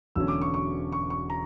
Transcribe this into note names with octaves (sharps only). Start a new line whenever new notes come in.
E1 E2 D3 F#3 C#4 E6
D6
C#6
C#6
C#6
C#6
A#5